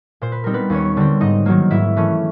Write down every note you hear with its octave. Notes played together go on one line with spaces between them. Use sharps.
A#2 C5
B4
G3 C4 D#4 A#4
B3 B4
D#2 C#4 C#5
D3 G3 C4
G#2 D#4 D#5
D#3 F#3 A#3
G#2 E4 E5
E3 A3 C#4